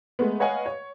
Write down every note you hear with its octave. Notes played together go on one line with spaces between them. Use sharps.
G#3 A3 B3
B4 C#5 D#5 F5 F#5 G#5
C#5